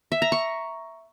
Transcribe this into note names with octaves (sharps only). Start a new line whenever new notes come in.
E5
A#5
C#6